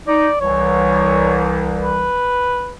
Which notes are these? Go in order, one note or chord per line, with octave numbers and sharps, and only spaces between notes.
D#4 D5
C2 E3 C#5
B4